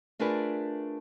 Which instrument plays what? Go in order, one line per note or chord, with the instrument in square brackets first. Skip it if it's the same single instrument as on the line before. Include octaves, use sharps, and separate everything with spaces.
[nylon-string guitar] A3 D4 F4 G#4 A#4 B4